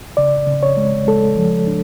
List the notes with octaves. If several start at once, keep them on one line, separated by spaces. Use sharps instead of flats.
C#3 D5
C#3
C#5
G#3
G#3 A4
F3
D4